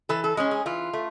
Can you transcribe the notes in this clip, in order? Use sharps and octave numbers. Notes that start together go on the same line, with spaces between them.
E3 A4
A4
G#3 C#4 G#4
G#4
E3 F4
A3